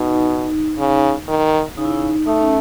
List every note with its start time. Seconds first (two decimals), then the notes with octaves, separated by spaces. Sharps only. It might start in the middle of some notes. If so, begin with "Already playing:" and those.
Already playing: B2 D#4
0.79 C#3
1.28 D#3
1.77 C#3 D#4
1.85 E4
1.92 D#4
2.27 A3 D#4
2.41 C#4